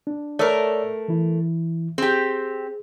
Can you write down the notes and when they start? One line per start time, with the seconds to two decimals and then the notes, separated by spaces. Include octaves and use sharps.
0.07 D4
0.39 A3 A#4 C#5 D5 E6
1.08 E3 E4
1.98 C4 G4 G#4